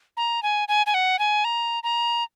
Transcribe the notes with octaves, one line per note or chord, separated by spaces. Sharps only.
A#5
G#5
G#5
G#5
F#5
G#5
A#5
A#5